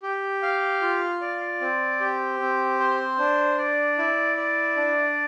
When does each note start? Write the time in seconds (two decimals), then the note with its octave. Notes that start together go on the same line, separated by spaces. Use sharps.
0.03 G4
0.43 F5
0.82 F4
1.21 D5
1.61 C4
2.00 G4
2.40 C4
2.80 C5
3.19 D4
3.58 D5
3.98 E4
4.37 D5
4.77 D4